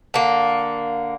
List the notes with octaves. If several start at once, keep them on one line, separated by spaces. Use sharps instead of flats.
D3 A#3